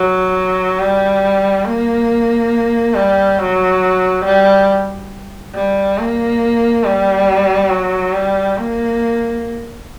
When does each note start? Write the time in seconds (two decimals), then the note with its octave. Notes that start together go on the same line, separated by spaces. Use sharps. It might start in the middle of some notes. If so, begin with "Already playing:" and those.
Already playing: F#3
0.79 G3
1.65 A#3
2.95 G3
3.38 F#3
4.25 G3
5.55 G3
5.98 A#3
6.84 G3
7.70 F#3
8.13 G3
8.57 A#3